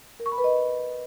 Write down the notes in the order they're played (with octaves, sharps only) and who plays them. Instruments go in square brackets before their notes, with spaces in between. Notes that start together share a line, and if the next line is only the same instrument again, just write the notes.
[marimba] A#4
C#6
B5
B4
D#5